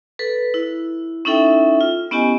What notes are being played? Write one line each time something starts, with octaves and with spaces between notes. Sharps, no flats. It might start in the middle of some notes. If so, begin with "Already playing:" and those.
A4 B4
E4
C#4 D#4 E4 A4 E5 G5
F4
B3 C#4 E4 G4 D#5 G#5